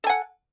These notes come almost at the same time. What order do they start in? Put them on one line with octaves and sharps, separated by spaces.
A4 G#5 F#5